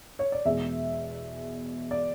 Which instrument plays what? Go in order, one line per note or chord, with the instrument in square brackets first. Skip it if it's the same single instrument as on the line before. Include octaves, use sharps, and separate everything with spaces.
[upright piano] C#5
D5
E2 B2 G#3 E5
D5